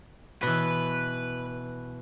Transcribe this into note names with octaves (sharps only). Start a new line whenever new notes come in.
B2 E3 B4